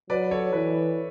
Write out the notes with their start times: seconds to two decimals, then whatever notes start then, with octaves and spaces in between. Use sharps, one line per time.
0.10 F#3 B4 D5
0.31 A4 C#5
0.52 E3 B4 D5